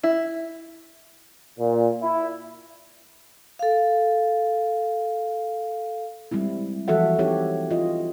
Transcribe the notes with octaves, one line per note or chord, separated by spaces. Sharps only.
E4
A#2
E4
A4 F5
G3 G#3 C4 E4
E3 F3 F#4 A4 E5 F#5
C4 D#4 E4 G4 C#5
F4 D#5